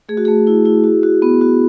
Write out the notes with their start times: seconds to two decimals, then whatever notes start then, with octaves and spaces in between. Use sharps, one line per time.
0.09 A3 G#4
0.17 F#4
0.25 A3 G#4
0.47 E4
0.66 E4
0.84 F#4
1.03 F#4
1.22 B3
1.41 F#4